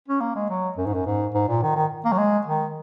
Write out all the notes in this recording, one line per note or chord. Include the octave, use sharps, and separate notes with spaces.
C#4
A#3
G#3
F#3
F#2
G#2
F#2
G#2
G#2
A#2
D#3
D#3
A#3
F#3
G#3
D#3